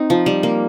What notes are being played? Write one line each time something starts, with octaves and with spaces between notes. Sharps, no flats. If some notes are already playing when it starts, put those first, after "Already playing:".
Already playing: C4 D#4
F3
G3
A#3